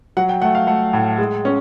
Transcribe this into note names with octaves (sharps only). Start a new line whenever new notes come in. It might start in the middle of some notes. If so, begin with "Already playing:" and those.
F#3 F#5
G5
A3 F#5
F5
A3 F#5
A2
G#3
C#4